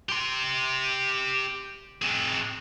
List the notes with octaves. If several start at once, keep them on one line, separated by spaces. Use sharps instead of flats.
G4 C6
C4 G#4